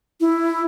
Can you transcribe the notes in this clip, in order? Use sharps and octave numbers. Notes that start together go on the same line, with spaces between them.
E4